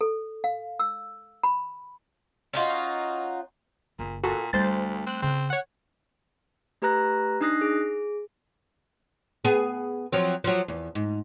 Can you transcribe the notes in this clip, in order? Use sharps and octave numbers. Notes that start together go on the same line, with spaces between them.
A4
F5
E6
B5
C#4 D#4 F4 F#4
F#1 A#2
A#2 F#4 A4
D2 G3 A3 C5 A6
C4 F#6
C#3 C4
C#5 F#5
A3 G4 B4 A#5 F#6 A#6
D4 D#4 D#6 F#6 A#6 C7
G#4
B3 G#4
F3 F#3 C4
F3 F#3
E2
G#2